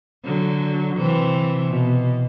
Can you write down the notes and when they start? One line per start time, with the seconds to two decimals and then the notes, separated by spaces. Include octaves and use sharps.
0.24 D3 F#3
0.97 C3 E3
1.69 B2